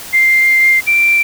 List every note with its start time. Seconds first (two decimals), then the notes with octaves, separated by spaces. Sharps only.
0.13 C7
0.87 D7